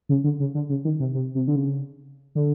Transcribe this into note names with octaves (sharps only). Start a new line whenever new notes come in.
C#3
D3
C#3
D3
C#3
D#3
C3
C3
C3
D3
C#3
D3